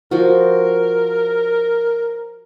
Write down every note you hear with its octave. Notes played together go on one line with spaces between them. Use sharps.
F3 F#4 A#4